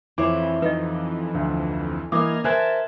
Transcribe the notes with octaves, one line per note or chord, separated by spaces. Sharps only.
F2 E3 E4 C5 C#5 D6
D#4 B4 D#5
D2
E3 A#3 D4 D#5 D6 D#6 F6 G#6
A#4 C5 E5 G#5 A5 F#6 G#6